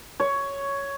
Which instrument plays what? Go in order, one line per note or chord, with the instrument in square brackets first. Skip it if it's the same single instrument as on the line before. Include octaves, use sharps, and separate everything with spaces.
[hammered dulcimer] C#5